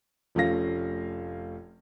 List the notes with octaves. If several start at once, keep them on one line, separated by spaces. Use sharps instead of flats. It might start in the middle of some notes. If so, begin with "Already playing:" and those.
F1 F3 A3 C#4 F5 A#6